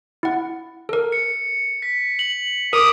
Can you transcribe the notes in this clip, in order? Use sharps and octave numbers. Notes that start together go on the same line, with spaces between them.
E4 F#5
A4 A#4
C#7
B6
F#7
A#4 D6 D#6 D7 F7